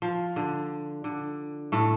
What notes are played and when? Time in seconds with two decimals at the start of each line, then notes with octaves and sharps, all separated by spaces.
0.02 F3
0.36 D3
1.04 D3
1.72 A2 A3